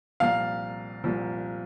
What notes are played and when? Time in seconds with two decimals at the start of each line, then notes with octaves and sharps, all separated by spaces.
0.20 C2 A#2 F3 F5
1.04 C2 A#2 F3